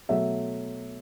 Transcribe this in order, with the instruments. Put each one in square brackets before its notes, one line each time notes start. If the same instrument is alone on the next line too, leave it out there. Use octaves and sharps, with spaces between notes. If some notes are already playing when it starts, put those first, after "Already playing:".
[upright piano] B2 F#3 A3 E5